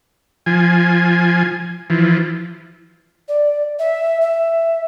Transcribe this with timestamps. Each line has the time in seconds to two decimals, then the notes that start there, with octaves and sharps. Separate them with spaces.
0.46 F3 G#5
1.90 E3 F3
3.28 D5
3.79 E5
4.21 E5